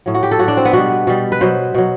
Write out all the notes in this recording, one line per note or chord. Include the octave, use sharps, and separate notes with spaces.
A2 F#3
F#4
G4
A4
A2 F#3 F#4
D4
C4
B3
B2 G3 F#4
B2 G3
B4
B2 F#3 C5
B2 F#3